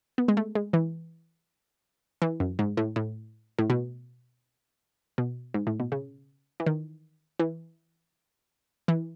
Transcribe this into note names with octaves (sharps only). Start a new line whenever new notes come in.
B3
G#3
A3
G#3
E3
E3
F#2
G#2
A2
A2
A2
B2
B2
G#2
A2
B2
C#3
E3
D#3
E3
E3